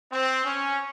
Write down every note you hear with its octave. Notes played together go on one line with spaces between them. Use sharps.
C4
C#4